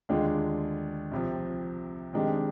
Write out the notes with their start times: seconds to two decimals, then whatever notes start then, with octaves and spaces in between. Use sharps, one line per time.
0.09 D#2 D3 G#3 D4 F4
1.11 C2 C3 F3
2.13 F2 D#3 G#3 D4 G4